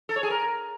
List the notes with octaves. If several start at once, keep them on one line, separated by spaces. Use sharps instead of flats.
A4
C#5
G#4
A#4